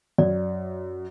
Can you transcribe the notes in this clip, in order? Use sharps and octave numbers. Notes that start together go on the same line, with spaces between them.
F#2 D5